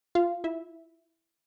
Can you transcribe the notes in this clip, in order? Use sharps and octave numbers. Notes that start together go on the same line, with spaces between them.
F4 F5
E4 E5